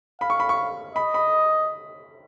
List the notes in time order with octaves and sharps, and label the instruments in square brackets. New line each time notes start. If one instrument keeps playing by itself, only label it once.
[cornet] F5 [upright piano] B5
[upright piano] C#6
B5
C#6
[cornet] D#5 [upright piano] B5
[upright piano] B5